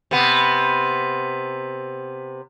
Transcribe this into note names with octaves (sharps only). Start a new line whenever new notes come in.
C3 B3